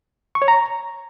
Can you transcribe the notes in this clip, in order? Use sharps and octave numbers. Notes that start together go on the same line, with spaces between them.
C#6
C#5
A#5